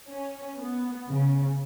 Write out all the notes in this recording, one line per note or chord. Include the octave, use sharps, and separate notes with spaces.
C#4
B3
C#3